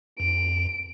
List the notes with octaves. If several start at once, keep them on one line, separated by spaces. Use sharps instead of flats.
F2 D7